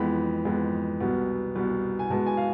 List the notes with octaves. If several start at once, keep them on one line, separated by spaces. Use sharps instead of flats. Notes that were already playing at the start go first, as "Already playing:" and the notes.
Already playing: F2 E3 G#3 B3 B5
F2 E3 G#3 B3
C2 B2 B3
C2 B2 B3
G#5
B2 G#3 B3 A5
G#5
F5